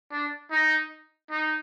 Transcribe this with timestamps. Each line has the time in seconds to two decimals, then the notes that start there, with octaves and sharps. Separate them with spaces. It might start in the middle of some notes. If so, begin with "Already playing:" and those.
0.11 D4
0.51 D#4
1.30 D#4